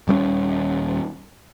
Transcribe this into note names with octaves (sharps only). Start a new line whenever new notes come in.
D#1 G3 A3 C#4